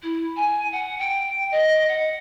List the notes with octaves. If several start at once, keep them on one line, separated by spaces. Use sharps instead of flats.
E4
G#5
F#5
G5
D#5
F#5